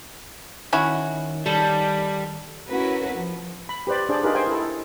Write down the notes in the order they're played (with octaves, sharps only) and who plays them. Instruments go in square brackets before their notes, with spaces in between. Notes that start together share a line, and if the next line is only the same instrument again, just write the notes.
[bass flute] D#3 [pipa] C#4 E4 F#4
[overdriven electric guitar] G3 [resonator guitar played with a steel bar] A4
[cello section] C#4 E4 F#4 A#4 B4
F3
[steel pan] B5
G4 B4 C5 D5
D4 G#4 C5 D5
D#4 F4 G4 G#4 A#4 B4
C5 D#5 F5 G5 G#5
E4 A4